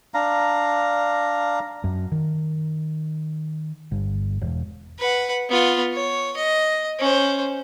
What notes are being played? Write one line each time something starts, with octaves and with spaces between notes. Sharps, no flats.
D4 F5 A#5
F#2
D#3
G1
E1
B4 F#5
B3 F4
C#5
D#5
C#4 C5